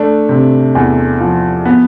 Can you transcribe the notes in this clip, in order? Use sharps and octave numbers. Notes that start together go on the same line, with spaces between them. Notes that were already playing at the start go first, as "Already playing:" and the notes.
Already playing: A3 D4
C3
E2
F3
B3